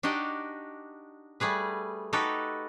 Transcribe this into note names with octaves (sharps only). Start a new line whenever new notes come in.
D4 D#4 F#4 G4 D#5
G3 A3 G#4 B4
D#4 F#4 G4 A4 B4